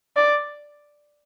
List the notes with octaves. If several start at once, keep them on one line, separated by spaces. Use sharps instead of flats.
D5